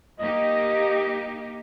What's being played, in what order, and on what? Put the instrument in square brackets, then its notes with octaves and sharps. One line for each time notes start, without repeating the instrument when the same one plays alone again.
[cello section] A#3 D#4 G4 [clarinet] D#5